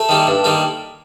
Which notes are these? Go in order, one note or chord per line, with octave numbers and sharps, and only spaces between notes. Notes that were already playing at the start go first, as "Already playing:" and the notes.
Already playing: A3 A4
D#3 G3 A#3
G2
D#3 G3 A#3